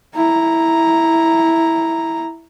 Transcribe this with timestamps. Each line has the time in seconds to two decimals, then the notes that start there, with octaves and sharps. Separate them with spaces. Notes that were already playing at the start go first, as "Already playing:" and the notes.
0.15 E4 A#5